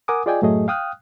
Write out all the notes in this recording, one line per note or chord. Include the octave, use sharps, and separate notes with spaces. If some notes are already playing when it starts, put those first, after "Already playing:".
A#4 F#5 G#5 D6 D#6
F4 G#4 D5 D#5 G5 G#5
F#2 A2 F#3 A3 G#4 D#5
F5 G5 D#6 F6 F#6